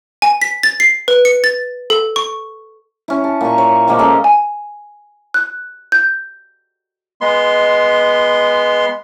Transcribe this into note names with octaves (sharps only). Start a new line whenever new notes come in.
G#5
B6
A6
C7
B4
C#7
A6
A4
C#6
C#4 E4
A5
A#2 C#6
C#5
A#2 F3 G#3 A#3
G#3 C#4 A4 D#5
G#5
F#6
G6
G#3 B3 C6